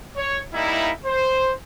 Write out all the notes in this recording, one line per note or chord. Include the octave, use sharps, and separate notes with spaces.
C#5
G3 A#3 D#4 E4
C5